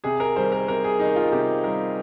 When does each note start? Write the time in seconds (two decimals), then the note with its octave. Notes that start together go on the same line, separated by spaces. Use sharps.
0.04 C3 G#4
0.20 A#4
0.36 D#3 G3 C5
0.52 A#4
0.68 C3 A#4
0.84 G#4
0.99 D#3 G3 D#4
1.16 F4
1.32 C3 G4
1.64 D#3 G3 A#4